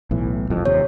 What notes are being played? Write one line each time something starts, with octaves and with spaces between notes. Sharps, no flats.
B1 A2 E3
E1 C2 F2
D#2 C3 C#5